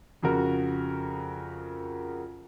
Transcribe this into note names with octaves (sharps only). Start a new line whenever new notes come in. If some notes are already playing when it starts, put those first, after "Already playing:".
F2 C#3 F#4 A#4